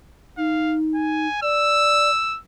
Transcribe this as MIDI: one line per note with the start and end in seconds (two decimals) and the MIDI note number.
0.38 1.27 63
0.38 0.76 77
0.95 1.40 80
1.42 2.10 74
1.42 2.39 88